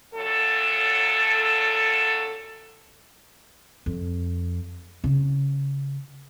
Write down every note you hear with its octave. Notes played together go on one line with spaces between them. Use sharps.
F#2 A#2 F#3 A4
F2
C#3